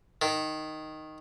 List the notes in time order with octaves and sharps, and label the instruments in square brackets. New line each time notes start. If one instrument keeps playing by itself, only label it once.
[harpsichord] D#3